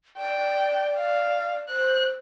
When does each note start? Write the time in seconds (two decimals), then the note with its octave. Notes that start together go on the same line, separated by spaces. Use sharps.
0.17 D5 G5
0.97 F5
1.69 C5 F#6